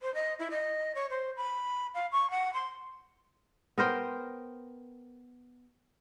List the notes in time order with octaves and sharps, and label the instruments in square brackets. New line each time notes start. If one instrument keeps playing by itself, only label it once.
[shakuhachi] C5
D#5
E4
D#5
C#5
C5
B5
F5
C#6
F#5
C6
[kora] B3 A#4 C5 G5